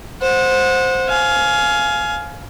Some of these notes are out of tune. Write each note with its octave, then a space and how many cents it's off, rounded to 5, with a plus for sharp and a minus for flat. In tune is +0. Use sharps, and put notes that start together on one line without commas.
C5 +0 F#5 -25
F5 +0 G#5 +25